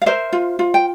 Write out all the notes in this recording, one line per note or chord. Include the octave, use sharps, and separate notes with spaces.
F5
A#4 C5 E5
F4
F4
G5